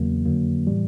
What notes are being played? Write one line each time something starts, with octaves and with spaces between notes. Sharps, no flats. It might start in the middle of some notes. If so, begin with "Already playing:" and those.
Already playing: E2 C#3 F#3 A#3
F2 D3 F#3 A#3
A2 E3 G3